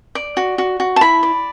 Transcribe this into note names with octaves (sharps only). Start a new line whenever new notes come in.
D5
F#4
F#4
F#4
A5
E4 B5
D5